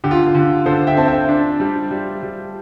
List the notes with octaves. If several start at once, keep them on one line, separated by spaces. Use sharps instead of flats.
D3 G4
F4
F4
D3
D3 A4 C5
E5 G5
C4 A5
E5 G5
D4
G3
G3
G3